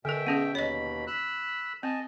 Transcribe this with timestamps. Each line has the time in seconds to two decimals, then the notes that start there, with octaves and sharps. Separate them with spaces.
0.05 B2 D3 A#4 E5 G5
0.27 B3 C#4 G#4
0.55 D#2 B2 C#5 D#5 B5
1.07 B5 E6 F#6
1.83 C4 D#5 G#5 A5